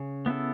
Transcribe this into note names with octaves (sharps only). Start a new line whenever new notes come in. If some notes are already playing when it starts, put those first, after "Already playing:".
Already playing: C#3
B3 E4 A4